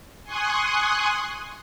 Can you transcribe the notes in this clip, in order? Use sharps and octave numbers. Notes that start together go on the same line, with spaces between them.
G#5 C6 C#6 D#6 F#6